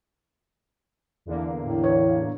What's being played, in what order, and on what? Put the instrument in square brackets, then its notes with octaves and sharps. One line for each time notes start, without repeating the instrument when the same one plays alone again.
[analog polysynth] E2 D3 A#3
[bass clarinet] A2
[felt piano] C#5